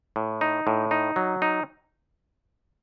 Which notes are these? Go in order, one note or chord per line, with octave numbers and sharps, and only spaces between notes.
A2
D#4
A2
D#4
F#3
D#4